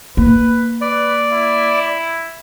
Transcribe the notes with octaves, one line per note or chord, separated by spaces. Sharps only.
A#3 B4
B4 D5
E4